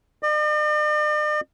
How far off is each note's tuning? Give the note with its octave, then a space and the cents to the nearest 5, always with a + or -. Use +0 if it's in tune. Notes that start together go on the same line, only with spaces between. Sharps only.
D5 +45